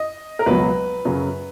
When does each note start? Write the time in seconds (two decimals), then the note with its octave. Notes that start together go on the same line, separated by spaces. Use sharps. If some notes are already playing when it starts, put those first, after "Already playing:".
Already playing: D#5
0.39 A#4
0.46 C#2 B2 F#3 B4
1.05 F#2 C#3 F#3